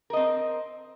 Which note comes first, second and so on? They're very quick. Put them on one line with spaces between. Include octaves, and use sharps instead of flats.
A#4 D#5 C4